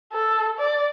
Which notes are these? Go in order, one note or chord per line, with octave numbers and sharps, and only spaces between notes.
A4
D5